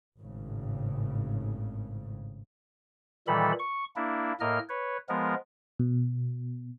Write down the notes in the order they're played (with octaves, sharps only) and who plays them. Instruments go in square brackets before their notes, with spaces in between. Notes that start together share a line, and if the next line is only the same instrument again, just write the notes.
[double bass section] G#1 A2 C#3
[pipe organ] A#2 D#3 E3 G3 A4 B5
C#6
A#3 D4 E4
A2 A#3 A#4 D#5 F6
B4 C#5
F3 G#3 B3 A#4
[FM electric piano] B2